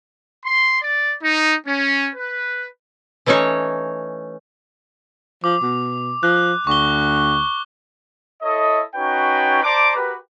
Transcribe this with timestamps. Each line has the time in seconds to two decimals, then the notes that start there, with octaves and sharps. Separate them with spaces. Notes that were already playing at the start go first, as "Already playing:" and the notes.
0.46 C6
0.81 D5
1.22 D#4
1.67 C#4
2.15 B4
3.26 E3 A3 C#4 D#4 C#5
5.44 F3 D6
5.62 B2
6.23 F3 F#6
6.67 D2 C#6 G7
8.42 E4 A4 C#5 D#5
8.95 C#4 D#4 F#4 B4 C#5 G5
9.63 C5 D5 A5 A#5 D6
9.96 F#4 G4 A#4 B4